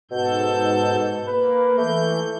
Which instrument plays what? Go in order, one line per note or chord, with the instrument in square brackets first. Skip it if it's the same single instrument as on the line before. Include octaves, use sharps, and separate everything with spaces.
[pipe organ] G#2 A4 G6 [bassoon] B2
[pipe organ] A#3 [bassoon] B4
[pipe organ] E3 G6 [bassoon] A3